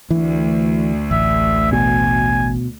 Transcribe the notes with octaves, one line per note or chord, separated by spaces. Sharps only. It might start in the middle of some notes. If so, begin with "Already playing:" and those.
D2 E3
A1 E5
B2 G#5